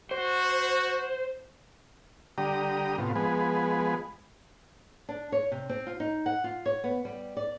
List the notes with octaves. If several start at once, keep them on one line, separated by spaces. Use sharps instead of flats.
F#4 C5
D3 G3 G4 A#5 D#6
A2 C3 B3 F4
F3 G#3 B3 G#4 B4
D4
C#5
C3
C4
F4
D#4
F#5
F4
C#5
B3
G3
D5